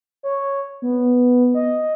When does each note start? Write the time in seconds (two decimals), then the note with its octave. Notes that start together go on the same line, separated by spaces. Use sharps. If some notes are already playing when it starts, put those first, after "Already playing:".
0.23 C#5
0.82 B3
1.54 D#5